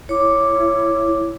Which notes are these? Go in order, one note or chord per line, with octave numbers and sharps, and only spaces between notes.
E4 C#5 D6